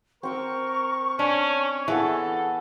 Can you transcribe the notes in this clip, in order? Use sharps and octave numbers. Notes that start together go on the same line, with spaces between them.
C4 A#4 G5 C#6 E6
C#4 D4
E3 B3 G#4 A4 A5